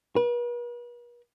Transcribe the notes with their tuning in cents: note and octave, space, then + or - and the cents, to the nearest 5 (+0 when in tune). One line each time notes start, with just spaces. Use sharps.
B4 -45